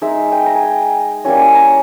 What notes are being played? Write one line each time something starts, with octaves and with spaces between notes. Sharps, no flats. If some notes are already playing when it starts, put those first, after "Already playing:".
G#3 D#4 E5
G5
A#5
G#5
G5
G3 A#3 C#4 E4 G#5
A#5